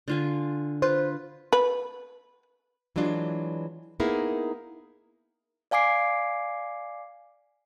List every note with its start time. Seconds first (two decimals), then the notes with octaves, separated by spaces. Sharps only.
0.08 D3 F4 G#5
0.82 F4 B4 C5
1.53 B4
2.96 E3 F#3 G#3 D4 F4
4.00 A#3 B3 D#4 E4 G#4 A#4
5.71 D5 F5 G#5 D6 C7